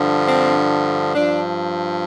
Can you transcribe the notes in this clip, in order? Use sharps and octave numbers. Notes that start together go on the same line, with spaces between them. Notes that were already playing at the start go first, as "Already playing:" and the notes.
Already playing: G2 D3 F3
C4
G2 F3 D4